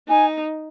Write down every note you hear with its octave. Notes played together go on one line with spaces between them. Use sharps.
D#4 G#5